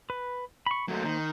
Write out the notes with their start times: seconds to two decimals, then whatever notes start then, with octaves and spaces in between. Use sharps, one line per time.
0.10 B4
0.66 B5 C#6
0.88 F#3 A3 A#3 C5
1.04 D#3